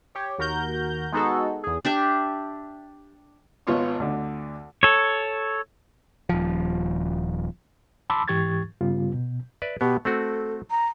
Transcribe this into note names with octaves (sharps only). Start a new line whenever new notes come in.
G4 C#5
D#2 F#4 A#4 A#5 G6
G#3 B3 D#4 F#4 G#4 A4
E2 G#4
D4 G4 E5
G#1 B3 F4 C#5 C6 C#6
D2 D3
A4 C#5
D#1 F3
A5 B5 C6 D6 E6
G#2 E3 G4 C#6 G#6 A6
G2 C#3 G3 B3 F4
B2
B4 D5 E5
B2 B3 G4
A3 C4 F#4 A4
A#5